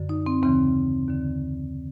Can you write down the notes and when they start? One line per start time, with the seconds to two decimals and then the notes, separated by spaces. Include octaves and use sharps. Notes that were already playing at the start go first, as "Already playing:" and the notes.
Already playing: F#2 D3
0.09 D#4
0.26 C4
0.42 D#2 C#3 E3 C4
1.08 D#2 D3